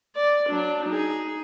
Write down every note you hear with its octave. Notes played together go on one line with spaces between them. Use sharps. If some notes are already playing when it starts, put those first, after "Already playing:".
D5
F#3 D4
D#4 G#4